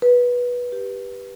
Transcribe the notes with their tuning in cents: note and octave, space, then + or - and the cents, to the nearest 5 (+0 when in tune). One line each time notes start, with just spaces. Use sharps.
B4 -15
G4 +5